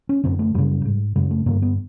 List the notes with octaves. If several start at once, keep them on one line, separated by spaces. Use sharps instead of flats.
C#4
F#2 D3 C4
A3
F#2 C#3 G3
G#2
F#2 C#3 G#3
A3
G2 D3 A#3
B3